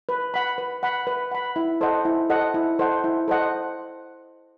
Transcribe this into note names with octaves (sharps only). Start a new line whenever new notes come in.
B4
F#5 B5
B4
F#5 B5
B4
F#5 B5
E4
A4 C5 D#5 F#5
E4
A4 C5 D#5 F#5
E4
A4 C5 D#5 F#5
E4
A4 C5 D#5 F#5